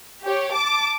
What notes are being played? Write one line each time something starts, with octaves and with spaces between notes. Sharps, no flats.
G4 C#5
A5 D6